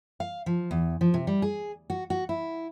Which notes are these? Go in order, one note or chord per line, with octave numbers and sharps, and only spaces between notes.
F5
F3
E2
F3
C3
G3
G#4
F#4
F#4
E4